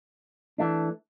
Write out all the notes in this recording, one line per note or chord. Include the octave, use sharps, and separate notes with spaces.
E3 A3 D4